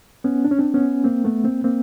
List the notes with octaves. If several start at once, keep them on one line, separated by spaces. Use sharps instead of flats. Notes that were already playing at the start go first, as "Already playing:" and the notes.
B3 C#4
D4
C#4
C4 D4
B3 C#4
A#3 C4
A3 B3
A#3 C4
A#3 C4